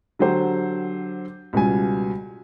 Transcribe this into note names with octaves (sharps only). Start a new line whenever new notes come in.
D3 F#3 G4 C5
C#2 B2 G3 G#5